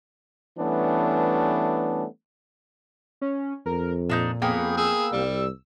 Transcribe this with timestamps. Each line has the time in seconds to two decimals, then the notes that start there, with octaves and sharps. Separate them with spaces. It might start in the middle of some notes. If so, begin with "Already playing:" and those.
0.58 E3 G3 A3 B3 C#4 D4
3.21 C#4
3.66 F2 A#4
4.10 A#2 D4 D#4 G6
4.42 F2 A#3 B3 G#4 G5
4.77 G#4 E6
5.12 C2 G3